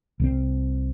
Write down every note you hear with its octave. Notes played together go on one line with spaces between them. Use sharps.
C2 G3 C4